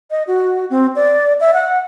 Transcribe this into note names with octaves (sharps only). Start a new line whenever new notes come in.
D#5
F#4
C4
D5
E5
F#5